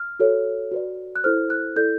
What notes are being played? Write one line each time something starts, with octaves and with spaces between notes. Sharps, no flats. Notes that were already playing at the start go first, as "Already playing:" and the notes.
Already playing: F6
F#4 A4 C#5
F#4 B4 D5
F#6
E4 A4 C5 F6
F#6
E4 A4 D5 G6